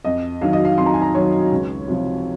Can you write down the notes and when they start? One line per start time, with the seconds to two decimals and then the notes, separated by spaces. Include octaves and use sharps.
0.05 F2 D#5
0.41 D#3 F#3 F5
0.53 D#5
0.65 F5
0.78 F2 C6
0.86 A#5
0.94 G#5
1.02 A#5
1.15 D#3 F#3 C#5
1.52 C#2
1.88 C3 F3